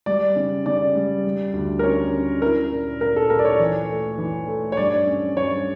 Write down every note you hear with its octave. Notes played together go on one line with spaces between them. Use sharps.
G3 D5
C#3
C#3 D5
G3
G3
D2
A#4
C#4 C#5
C#4
E4 A#4
A#2
A#2 A#4
A4
A#2 A#4
D5
C#5
E3
A3
E3
A3
C#5
G2 D5
C#4
G2 C#5